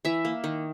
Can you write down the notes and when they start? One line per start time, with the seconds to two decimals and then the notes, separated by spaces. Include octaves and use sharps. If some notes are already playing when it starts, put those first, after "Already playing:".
0.05 E3 E5
0.25 A#3
0.44 D#3